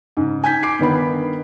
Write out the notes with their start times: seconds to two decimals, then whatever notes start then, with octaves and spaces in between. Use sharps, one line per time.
0.17 G#2 C#3
0.44 G#5 G6 G#6 B6
0.63 D6 B6 C7 D7
0.79 G2 D#3 B3 B5